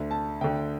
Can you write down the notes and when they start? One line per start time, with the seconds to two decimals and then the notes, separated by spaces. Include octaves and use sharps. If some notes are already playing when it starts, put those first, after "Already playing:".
Already playing: D2 D3
0.11 A5
0.41 D2 D3 G5